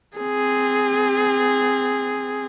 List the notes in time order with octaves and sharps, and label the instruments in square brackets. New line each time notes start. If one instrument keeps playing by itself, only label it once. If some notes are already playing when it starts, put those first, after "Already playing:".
[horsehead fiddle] C4 G#4